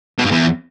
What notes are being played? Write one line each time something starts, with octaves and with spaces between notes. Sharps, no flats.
B2
G2
E2